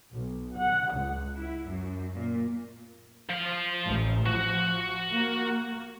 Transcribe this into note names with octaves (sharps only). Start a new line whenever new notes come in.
B1
F#5
C#2
E4
F#2
A#2
F3 F5
A1
F3 F#4
A#3